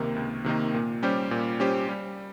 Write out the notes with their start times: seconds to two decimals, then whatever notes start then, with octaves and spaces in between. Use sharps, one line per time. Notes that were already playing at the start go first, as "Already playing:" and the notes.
Already playing: C#2 C3 D#3 A#3 D#4
0.16 C#2
0.44 C3 D#3 A#3 D#4
0.74 A#2
1.03 G3 C#4 G4 C5
1.31 A#2
1.60 G3 C#4 G4 C5
1.89 G3